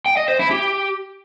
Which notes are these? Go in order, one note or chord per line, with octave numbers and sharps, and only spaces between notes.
G5
D#5
C5
E4
G4